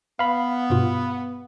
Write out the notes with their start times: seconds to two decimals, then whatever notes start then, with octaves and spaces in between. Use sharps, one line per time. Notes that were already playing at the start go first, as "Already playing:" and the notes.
0.19 B3 F5 B5
0.70 G2 B2 F4